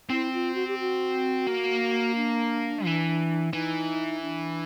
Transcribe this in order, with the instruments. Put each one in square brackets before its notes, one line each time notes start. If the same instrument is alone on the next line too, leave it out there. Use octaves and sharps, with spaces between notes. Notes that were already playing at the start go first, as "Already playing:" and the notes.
[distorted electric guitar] C4 [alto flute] E4
[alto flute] F4
F#4
G4
F#4
[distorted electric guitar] A#3
[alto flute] D4
[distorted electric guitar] E3
[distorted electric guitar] E3 [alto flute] D#4
[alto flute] D4